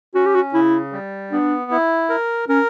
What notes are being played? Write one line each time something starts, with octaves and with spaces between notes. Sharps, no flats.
C#4 F#4
G4
F#4
C#3 E4
G3
B3 D4
E4
A#4
C#4 A#4